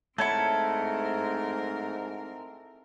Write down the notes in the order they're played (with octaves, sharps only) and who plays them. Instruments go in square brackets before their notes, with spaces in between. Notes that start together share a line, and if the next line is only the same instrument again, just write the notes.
[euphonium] G#2 [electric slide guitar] A3 C#5 F#5 [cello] C4 A#4 [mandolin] E4 A4